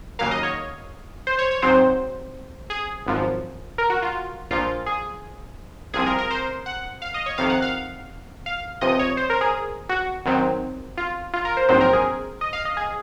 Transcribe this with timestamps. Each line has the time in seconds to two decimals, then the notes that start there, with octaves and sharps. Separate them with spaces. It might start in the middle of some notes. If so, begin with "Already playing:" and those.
0.19 D#2 C#3 F#3 A#3 F5
0.31 D#5
0.43 C#5
1.27 C5
1.39 C#5
1.51 C#5
1.62 G#2 F#3 C4 C5
2.70 G#4
3.06 G#1 F#2 F3
3.78 A#4
3.90 F#4
4.02 F4
4.51 A#1 A#2 F3 F4
4.86 G#4
5.94 C2 C3 F3 C4 G#4
6.06 A#4
6.19 A#4
6.31 C5
6.66 F#5
7.02 F5
7.14 D#5
7.26 C#5
7.38 F2 C3 D#3 F5
7.50 F#5
7.62 F5
8.46 F5
8.81 C#2 C3 F3 D#5
8.99 C#5
9.17 C5
9.30 A#4
9.41 G#4
9.89 F#4
10.25 F#2 D#3 F#3 C4
10.98 F4
11.34 F4
11.45 A#4
11.57 C5
11.69 A#1 G#2 D#3 F#3 C4 C5
11.81 A#4
11.93 G#4
12.41 D#5
12.53 F5
12.65 D#5
12.77 G#4